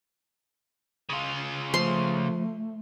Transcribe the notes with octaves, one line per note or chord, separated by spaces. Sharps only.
C#3 F4
F3 A3 C6